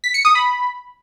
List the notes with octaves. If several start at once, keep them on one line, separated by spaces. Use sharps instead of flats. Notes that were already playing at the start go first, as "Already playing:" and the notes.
B6
C#7
D#6
B5